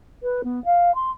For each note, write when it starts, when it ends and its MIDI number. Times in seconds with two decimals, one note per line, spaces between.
0.23 0.42 71
0.44 0.63 59
0.65 0.94 77
0.95 1.11 84